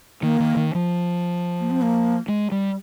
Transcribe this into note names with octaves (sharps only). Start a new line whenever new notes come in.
D#3 A#3
D#3
D#3
F3
A#3
C4
A#3
G#3
G3